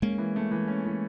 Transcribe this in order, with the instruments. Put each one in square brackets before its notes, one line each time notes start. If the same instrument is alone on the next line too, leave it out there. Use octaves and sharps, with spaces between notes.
[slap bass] G#3 A#3 [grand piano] C#4
[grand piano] E3
A3
E3
C#4
E3